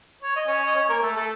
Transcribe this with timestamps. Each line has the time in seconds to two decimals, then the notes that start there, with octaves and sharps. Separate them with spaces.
0.22 C#5
0.36 D#5
0.47 C#4 C#5
0.66 D#5
0.75 C#4 C#5
0.89 A#3 A#4
1.03 A3 A4
1.16 A3 A4